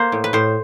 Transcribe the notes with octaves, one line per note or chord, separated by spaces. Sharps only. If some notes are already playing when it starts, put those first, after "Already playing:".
Already playing: A#3 C5
A2
B4
A2 C5